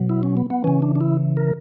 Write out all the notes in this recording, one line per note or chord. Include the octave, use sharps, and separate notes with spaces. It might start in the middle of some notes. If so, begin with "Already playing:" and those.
Already playing: B2 F#3
E4
C#4
B3
B3
C#3 E3 C#4
D4
D4
E4
A#4